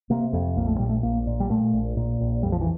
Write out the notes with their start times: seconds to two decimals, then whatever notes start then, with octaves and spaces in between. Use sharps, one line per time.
0.10 C3 A#3
0.33 F2
0.57 A#1 A#3
0.67 A3
0.79 A#2 G3
0.89 A3
1.03 A#1 A#3
1.27 A#2
1.40 G3
1.50 A#2 A3
1.73 A#1
1.97 A#2
2.20 A#1
2.43 F2 G3
2.52 F3
2.61 E3